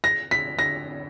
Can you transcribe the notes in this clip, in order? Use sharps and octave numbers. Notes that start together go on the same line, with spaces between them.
A#6
B6
A#6